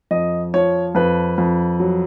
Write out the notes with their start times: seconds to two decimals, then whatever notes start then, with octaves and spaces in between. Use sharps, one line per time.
0.11 F2 D#5
0.54 F3 C#5
0.95 F2 B4
1.38 F2
1.80 F#3